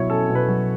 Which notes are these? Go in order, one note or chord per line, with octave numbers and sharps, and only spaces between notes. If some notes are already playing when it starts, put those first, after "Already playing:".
Already playing: B2 F#3 E4 C#5
C#4 A4
B2
B4
F#3